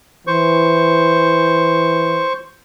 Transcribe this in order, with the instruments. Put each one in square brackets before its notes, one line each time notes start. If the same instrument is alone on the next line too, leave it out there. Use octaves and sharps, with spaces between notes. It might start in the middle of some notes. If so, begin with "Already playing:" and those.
[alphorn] E3 [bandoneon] C5 C#6